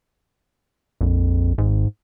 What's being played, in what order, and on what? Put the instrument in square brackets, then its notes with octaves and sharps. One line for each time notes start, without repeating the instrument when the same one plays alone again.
[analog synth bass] A#1 [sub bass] F2
[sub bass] G#1 [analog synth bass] G#2